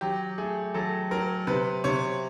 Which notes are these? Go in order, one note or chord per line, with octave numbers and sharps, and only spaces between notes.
F#3 G4
A3 G#4
F#3 A4
F#3 A#4
C3 B4
C3 C#5